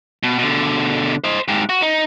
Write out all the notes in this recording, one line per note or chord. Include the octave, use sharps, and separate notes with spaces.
B2
B2 D3
C5 D#5
G#2 G4
F#4
D#4